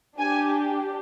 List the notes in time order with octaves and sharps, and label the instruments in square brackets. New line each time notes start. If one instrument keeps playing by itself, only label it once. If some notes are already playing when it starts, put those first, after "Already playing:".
[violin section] D4 G4 G#5